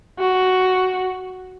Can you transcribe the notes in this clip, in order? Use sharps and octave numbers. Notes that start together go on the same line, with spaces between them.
F#4